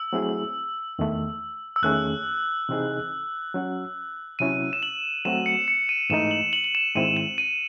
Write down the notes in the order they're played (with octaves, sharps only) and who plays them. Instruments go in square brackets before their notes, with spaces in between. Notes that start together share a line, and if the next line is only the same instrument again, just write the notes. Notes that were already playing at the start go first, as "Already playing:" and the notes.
Already playing: [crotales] E6
[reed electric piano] F#3 A3 C4 E4 G#4
E2 D#3 A3
[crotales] E6
[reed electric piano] E2 D#3 A3 C#4 G#4 [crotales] F#6
[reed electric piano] C3 E3 C4 D#4 G#4
F#3 C#4 F#4
[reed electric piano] C3 F#3 C#4 E4 [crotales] D#7
[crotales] E7
F#7
[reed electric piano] F#3 A3 C4 F#4 [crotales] E7
[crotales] C#7
C#7
D#7
[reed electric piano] G#2 E3 A3 D#4 [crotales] E7
[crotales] F#7
F#7
F#7
E7
[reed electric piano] G#2 D#3 G#3 C4 E4 [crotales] D#7
[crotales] E7
D#7